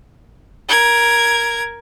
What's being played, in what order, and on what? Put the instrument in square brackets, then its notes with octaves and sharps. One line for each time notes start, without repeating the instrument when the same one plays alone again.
[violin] A#4 G#6